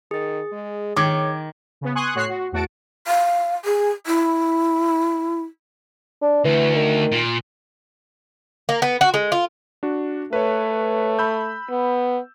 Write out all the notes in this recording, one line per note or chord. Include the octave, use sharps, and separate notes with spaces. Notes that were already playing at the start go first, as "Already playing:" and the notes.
D#3 G#4 A6
G#3
D#3 C#5 D6 G#6
C#3 B3
G#5 C6 C#6 D#6 F#6
A2 F#4 C#5 F#6 C7
F#4
E2 A2 F#4 F#5 A5 D7
F5
G#4
E4
D4
D2 E3
D#3
A#2
A#3
B3
F#4
G#3
F4
D4 F#4
A3 B4 C#5
B5 E6 G6
B3